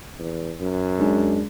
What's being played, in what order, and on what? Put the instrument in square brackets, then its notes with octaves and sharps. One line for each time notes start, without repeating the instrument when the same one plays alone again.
[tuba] E2
F#2
[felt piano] G#3 D4 G#4